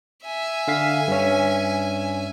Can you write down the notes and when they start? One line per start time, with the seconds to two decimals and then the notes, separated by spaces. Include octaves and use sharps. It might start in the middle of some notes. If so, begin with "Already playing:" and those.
0.25 E5 G#5
0.68 D3 F5 B6
1.08 G2 C#4